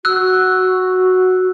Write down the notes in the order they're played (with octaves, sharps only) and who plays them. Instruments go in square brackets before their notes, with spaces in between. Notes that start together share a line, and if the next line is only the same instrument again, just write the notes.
[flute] F#4 [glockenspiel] E6 F#6